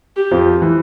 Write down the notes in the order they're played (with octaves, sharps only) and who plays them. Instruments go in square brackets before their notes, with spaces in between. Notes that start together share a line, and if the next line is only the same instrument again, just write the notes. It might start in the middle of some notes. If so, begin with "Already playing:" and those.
[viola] G4
[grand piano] F2 F3
E3